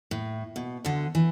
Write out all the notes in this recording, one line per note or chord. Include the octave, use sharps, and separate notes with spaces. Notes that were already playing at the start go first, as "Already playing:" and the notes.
A2
B2
D2 D3
E3